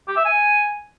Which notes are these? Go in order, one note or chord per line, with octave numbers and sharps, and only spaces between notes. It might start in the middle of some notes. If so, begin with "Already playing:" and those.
G4
E5
G#5